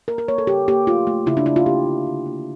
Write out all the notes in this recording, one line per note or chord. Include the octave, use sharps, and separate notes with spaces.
A#3 A#4
A#4
A#3 C#5
A4
C#3 G4
A#3 G4
A3 F4
A3
C#3 E4
D4
C#3 E4
F4
A#3 G4
D3
D3
A#3